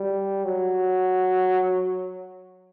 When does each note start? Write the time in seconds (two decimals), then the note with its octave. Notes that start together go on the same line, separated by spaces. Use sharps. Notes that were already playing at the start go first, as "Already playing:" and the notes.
Already playing: G3
0.44 F#3